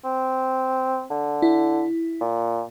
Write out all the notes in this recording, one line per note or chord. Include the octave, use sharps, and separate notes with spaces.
C4
D3
E4
A#2